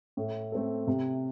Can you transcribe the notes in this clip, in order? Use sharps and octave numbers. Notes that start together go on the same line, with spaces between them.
A2
A3 C4 A4
C3